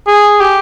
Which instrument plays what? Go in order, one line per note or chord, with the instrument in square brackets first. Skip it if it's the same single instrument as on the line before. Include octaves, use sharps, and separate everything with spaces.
[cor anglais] G#4
G4